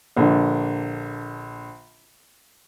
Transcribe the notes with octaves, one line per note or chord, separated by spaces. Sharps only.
A#1 D3